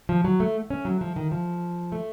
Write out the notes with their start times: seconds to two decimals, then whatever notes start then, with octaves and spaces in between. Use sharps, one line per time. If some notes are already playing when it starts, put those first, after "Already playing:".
0.09 F3
0.25 F#3
0.40 A3
0.70 C#4
0.85 F#3
1.01 F3
1.16 D#3
1.32 F3
1.92 A3